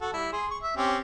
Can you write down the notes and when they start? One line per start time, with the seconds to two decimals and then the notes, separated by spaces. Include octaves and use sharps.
0.01 F#4 A4
0.13 G3 E4
0.33 G#4 C6
0.50 C#6
0.63 E5
0.77 C4 C#4 G4